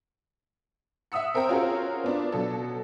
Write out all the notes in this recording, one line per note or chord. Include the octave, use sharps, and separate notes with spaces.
E5 F#5 D#6 E6 C#7
C4 A#4 C5 G5 A#5
C#4 F4 F#4 G#4 A#4 C5
B3 D4 F4
B2 F#3 A4